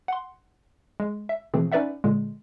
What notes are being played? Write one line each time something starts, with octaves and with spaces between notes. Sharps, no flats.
F#5 C6
G#3
E5
B2 E3 F3 A3 C4 G#4
C#4 D#4 B4 D5 E5 F#5
A#2 D3 G#3